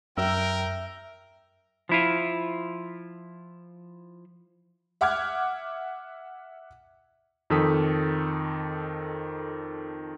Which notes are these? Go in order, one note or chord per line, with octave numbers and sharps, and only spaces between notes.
F#2 A#4 E5 G5
F3 E4 F4
E5 F#5 D6 F6 F#6 G#6
F2 D#3 A4 D#6 B6